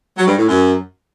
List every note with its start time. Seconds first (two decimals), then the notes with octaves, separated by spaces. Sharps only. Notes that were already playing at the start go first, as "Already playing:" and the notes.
0.17 F#3
0.27 G2
0.38 A2
0.48 F#2